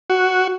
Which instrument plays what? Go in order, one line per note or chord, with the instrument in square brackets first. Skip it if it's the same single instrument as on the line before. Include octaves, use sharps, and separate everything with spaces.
[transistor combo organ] F#4